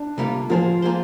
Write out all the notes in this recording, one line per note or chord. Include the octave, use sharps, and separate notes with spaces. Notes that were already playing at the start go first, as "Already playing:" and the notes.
Already playing: D4
C3 G3 A#3 F4
F3 A#3 F4 G#4 C5
A#3 F4 G#4 C5